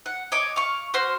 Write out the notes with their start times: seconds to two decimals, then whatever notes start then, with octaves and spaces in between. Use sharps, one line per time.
0.06 F#5
0.32 C#5 D#5 D6
0.56 F5 C#6
0.94 F#4 C5 F6